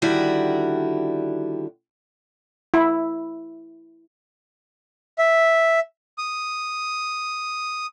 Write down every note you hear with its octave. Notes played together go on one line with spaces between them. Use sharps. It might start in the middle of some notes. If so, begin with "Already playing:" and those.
D3 D#3 G3 E4 F#4
E4
E5
D#6